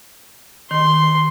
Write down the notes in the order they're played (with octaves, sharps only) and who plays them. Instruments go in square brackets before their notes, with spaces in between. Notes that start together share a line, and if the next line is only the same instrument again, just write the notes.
[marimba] D#3 [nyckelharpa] C6